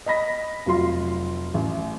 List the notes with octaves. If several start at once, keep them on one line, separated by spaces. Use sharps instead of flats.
D#5 B5 A#6 B6
F1 F#3 F4 C6
A1